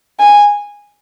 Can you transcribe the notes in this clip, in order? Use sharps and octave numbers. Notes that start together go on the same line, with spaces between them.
G#5